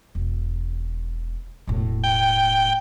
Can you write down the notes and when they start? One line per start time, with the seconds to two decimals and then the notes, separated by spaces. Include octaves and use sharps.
0.15 E1
1.67 E1 A2
2.04 G5